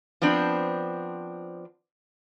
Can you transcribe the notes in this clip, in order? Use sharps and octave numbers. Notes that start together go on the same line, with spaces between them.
F3 B3 C4 D4